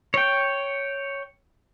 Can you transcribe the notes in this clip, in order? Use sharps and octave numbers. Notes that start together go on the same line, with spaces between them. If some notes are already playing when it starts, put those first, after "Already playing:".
C#5 G5